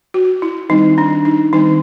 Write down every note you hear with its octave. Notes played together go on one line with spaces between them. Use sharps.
F#4
E4
D#3 G3 C4 D#4
D4
D#4
D#3 G3 C4 D#4